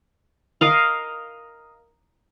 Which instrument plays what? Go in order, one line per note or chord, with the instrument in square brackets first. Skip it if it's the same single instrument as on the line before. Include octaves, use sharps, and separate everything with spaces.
[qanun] A#4 D#5 F5